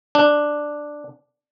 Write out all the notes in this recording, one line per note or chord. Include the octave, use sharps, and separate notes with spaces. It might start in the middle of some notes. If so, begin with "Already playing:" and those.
D4